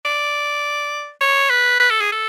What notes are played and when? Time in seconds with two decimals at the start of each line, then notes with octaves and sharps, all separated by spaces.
0.05 D5
1.21 C#5
1.50 B4
1.80 B4
1.90 A4
2.01 G#4
2.12 A4